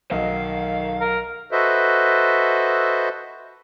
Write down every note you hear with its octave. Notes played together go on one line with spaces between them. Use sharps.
B1 D#3 F#3 D#5 F5
A#4
F#4 A4 B4 C5 D#5 E5